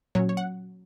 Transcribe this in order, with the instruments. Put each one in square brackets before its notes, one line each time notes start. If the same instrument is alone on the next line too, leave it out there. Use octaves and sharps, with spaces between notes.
[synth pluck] A#2 F#3 C#4 C#5
C#5
F#5